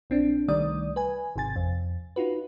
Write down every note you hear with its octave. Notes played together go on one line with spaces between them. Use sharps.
A#1 C4 D4
C2 D#3 G3 A3 D5 D#6
B4 G#5
G#1 C3 G#5 A6
F2
D#4 F4 F#4 B4